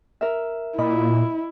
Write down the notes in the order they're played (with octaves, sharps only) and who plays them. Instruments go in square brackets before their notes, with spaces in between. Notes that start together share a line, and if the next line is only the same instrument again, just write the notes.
[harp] A#4 E5
[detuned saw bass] A#2 [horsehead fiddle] E4 [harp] D#5 B5